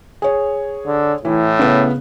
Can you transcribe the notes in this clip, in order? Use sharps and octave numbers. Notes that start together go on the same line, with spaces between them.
G#4 C#5
D3
A2 E3
C#3 B3